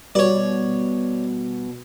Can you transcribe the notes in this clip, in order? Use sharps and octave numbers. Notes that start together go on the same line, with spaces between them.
B2 G3 C#5 D5